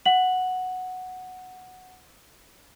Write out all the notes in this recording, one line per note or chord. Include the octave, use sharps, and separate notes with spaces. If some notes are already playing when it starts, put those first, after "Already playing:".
F#5 F#7